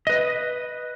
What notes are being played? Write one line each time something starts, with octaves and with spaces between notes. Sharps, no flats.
B4 D#5